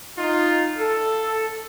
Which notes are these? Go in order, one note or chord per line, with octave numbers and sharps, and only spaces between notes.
D#4 F4
A4